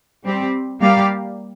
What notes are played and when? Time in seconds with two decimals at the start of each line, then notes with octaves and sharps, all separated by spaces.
0.24 G3 C4 G4
0.80 G3 A#3 G4 D5 F5